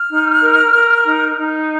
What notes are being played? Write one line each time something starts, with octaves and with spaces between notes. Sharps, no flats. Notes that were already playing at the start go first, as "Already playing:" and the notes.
Already playing: F6
D#4
A#4
A#4
D#4
D#4